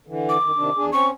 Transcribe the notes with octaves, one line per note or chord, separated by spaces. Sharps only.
D3 E3
D6
F#2 D#3
C3 D#3 D4
E2 D4 G#4
C4 C#4 C#6